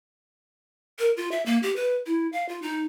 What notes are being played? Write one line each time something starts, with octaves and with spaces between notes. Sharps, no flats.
A#4
F4
E5
A#3
G4
B4
E4
F5
F4
D#4